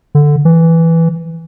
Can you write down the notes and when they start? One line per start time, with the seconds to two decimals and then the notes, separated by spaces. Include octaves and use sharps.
0.15 D3
0.45 E3